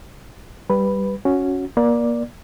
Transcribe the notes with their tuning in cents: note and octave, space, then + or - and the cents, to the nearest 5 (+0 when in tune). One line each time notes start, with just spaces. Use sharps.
G3 -5 B4 +0
C#4 +0 F#4 -10
A#3 +25 D5 +0